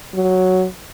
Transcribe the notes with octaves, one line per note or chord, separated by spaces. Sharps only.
F#3